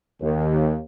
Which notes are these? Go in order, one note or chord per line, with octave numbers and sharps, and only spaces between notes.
D#2